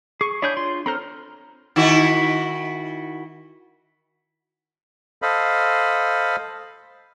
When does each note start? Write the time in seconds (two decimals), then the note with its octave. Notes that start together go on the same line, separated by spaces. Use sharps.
0.21 G#4 C#6
0.42 D4 E4 G#4 C#5 G6
0.57 F4 C6
0.86 C4 A4 C5 A#5 F6
1.76 D#3 E4 F#4
5.22 A4 C5 D#5 F5 B5